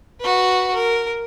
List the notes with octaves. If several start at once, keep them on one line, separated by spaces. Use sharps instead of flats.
F#4 B4
A#4